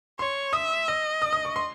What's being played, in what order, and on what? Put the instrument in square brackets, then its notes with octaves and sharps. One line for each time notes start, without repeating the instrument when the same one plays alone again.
[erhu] C#5 [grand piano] C6
[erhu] E5 [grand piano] D#6
[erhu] D#5 [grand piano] E6
[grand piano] D#6
D#6
C#6
C6